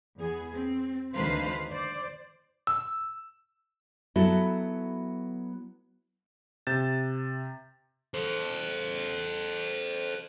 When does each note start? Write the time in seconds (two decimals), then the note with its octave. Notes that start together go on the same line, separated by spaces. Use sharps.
0.18 E2 B3 G#4
0.54 C4
1.13 D2 D#3 B4 C5 F5
1.68 C5 D5
2.67 E6
4.16 F#3 B3 E4 F#4 A4
6.67 C3 G6 A6 E7
8.14 A4 C5